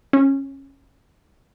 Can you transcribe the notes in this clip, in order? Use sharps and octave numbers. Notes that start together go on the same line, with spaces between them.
C#4